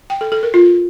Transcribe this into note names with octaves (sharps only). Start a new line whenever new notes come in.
G5
A4
A4
A#4
F4